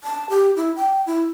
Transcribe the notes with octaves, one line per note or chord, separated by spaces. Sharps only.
A5
G4
E4
G5
E4